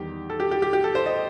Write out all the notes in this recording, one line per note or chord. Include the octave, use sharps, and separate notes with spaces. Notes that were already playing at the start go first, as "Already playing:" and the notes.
Already playing: E2 D#3 G3 G4
A4
G4
G4
G4
G4
A4
C5
D#5